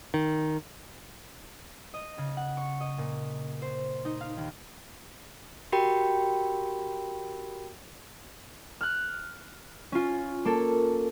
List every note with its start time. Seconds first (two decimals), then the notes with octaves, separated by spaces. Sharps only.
0.14 D#3
1.94 D#5
2.18 C#3
2.37 F#5
2.57 C#6
2.80 D#5
2.98 A#2
3.62 C5
4.05 D#4
4.21 F5
4.37 D#2
5.72 F#4 G4 A#4 G5 B5
8.81 F6 F#6
9.92 C#4 F4
10.45 A#3 A4